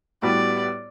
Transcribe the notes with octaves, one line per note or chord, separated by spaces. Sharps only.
A2 G3 B3 F#4 B4 D5